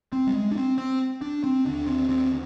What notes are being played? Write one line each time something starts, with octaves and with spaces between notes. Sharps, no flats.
C4
G3
G#3
D4
C4
C4
D4
C4
D#2 D3 D4
C4
C4